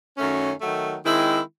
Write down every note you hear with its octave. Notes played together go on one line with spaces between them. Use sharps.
F#2 D#3 F#3 A3 C#4
D#3 F#3 A3
D#3 G#3 C4 E4